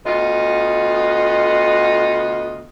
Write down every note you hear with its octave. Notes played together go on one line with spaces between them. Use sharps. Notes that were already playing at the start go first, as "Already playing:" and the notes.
D2 B3 F4 D#5